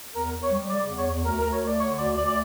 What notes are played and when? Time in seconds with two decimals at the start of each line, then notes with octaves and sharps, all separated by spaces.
0.15 E2 A#4
0.34 E2
0.43 C#5
0.51 G3
0.70 C#3 D5
0.88 E2
0.97 C#5
1.06 E2
1.24 D2 A#4
1.39 A#4
1.43 D2
1.52 C#5
1.61 A3 D5
1.80 D3 C#5
1.97 D2 D5
2.16 D2 D5
2.28 D5